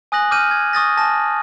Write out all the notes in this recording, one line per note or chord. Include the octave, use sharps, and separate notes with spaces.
G#5 D#6 F#6 A#6 F#7
D6 F6 G6 D#7
G#6
C#6 D#6 A6 A#6
G#5 A5 A#6